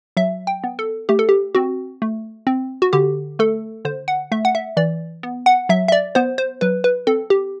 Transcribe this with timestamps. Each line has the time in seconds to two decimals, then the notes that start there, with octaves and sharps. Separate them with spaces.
0.17 F#3 E5
0.47 G5
0.64 B3
0.79 A4
1.09 A3 G4
1.19 A4
1.29 G4
1.55 C4 F#4
2.02 A3
2.47 C4
2.82 F#4
2.93 D3 G4
3.39 A3 A4
3.85 D3 C5
4.08 F#5
4.32 A3 E5
4.45 F#5
4.55 E5
4.77 E3 D5
5.23 B3
5.46 F#5
5.69 F#3 E5
5.88 E5
5.92 D5
6.15 B3 C5
6.38 C5
6.61 F#3 B4
6.84 B4
7.07 C4 A4
7.30 G4